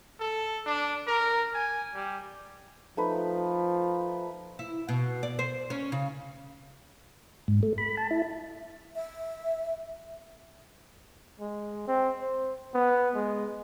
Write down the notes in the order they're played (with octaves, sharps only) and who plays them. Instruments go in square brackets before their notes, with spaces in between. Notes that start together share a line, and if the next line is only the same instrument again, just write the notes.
[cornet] A4
D4
A#4
G#5
G3
[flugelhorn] F3 [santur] A3 D#4 B4
[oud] E4
B2
D5
C5
C#4
C#3
[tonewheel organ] G#2
A3
B5
A5
E4
[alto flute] E5
[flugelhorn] G#3
C4
C5
B3
G#3